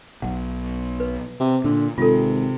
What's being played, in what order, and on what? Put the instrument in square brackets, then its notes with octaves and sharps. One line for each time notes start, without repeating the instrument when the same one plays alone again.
[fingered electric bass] B1 B2 [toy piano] F#5
[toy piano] B4
[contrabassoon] C3
[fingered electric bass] A#2 [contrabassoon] D3
[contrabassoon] G#1 [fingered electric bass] C3 [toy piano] F4 A4